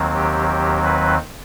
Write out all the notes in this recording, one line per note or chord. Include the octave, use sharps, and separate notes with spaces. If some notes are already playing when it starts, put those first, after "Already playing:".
Already playing: D#2 D#3 F#3 C4
G4
G4
B4